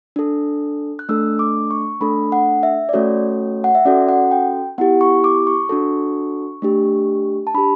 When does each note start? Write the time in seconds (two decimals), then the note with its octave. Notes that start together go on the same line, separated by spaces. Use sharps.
0.16 D4 A4
0.99 F#6
1.09 A3 D4 A4 E6
1.39 D6
1.71 C#6
2.01 A3 D4 A4 B5
2.32 F#5
2.63 E5
2.89 D5
2.93 A3 C#4 F#4 A4 C#5
3.64 F#5
3.75 E5
3.85 C#4 F#4 A4 D5
4.08 F#5
4.31 G5
4.78 B3 E4 G4 F#5
5.01 C#6
5.24 D6
5.47 C#6
5.69 D4 F#4 A4
6.62 A3 D4 G4
7.47 A5
7.54 D4 G4 B5